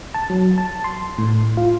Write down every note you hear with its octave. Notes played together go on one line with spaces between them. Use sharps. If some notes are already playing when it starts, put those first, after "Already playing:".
A5
F#3
A5
C6
A2
F4